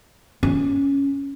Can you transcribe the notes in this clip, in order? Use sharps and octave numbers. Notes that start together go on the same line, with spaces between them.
C#4